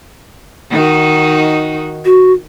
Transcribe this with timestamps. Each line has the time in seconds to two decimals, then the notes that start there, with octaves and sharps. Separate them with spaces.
0.70 D#3 D#4 F#4
2.05 F#4